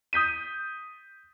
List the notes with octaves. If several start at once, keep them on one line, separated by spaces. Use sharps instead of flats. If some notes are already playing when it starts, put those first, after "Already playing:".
D#6 G6 B6 D#7